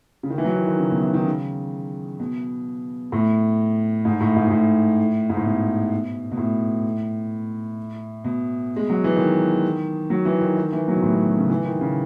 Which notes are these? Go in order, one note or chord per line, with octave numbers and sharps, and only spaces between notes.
C#3
D#3
E3
F#3
D#3
D#3
C#3
B2
E3
D#3
C#3
B2
A2
G#2
A2
G#2
G#2
A2
G#2
A2
B2
B2
A2
B2
G#3
F#3
E3
D#3
F#3
E3
D#3
D#3
E3
F#3
B2
A2
B2
B2
C#3
E3
D#3
C#3